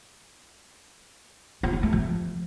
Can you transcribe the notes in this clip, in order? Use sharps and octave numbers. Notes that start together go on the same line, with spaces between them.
F4
C4
A3
F3